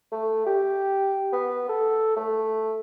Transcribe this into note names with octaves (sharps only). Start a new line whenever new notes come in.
A3
G4
B3
A4
A3